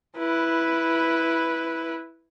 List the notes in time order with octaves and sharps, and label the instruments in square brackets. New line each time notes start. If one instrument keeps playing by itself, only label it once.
[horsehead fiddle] E4 B4